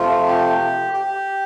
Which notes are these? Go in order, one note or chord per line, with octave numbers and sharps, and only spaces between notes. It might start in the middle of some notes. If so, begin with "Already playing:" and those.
Already playing: C3 F3 A3 F4
G4
G4